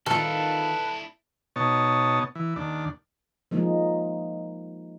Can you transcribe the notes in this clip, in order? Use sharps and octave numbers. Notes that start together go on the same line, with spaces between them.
D#3 D4 E4 F4 A4 B4
B2 D#4 C#5 A5
E3
D#2 D4
F3 G#3 A#3 D#4